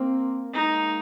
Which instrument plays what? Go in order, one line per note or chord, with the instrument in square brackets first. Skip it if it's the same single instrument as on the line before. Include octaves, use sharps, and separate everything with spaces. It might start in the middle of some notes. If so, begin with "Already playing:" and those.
Already playing: [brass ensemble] A#3 C4
[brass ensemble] G#3 A#3 [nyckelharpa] D#4